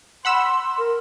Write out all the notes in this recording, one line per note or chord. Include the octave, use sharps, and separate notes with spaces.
F#5 B5 C6 E6
A#4